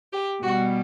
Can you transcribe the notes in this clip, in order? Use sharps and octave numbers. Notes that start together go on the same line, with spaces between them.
G4
B2 G3 F#4